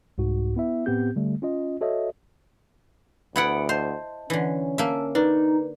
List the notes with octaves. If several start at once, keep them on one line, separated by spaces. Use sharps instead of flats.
C2 G#2 F#4
B3 E4 E5
A2 B3 C4 G4 G6
D3 G3 A3
C#4 F4 D#5
F#4 A4 C#5 D#5 E5
D2 B3 E4 F#5 B5 C#7 D7
C5 D#5 A5
D3 E3 C#4
A#3 E5 F5 A5 E6
D4 D#4 B4